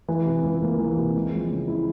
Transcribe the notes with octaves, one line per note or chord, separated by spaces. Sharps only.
E3
C3
C#2
A#3
E3
C3
G#3
F3
C#3
E4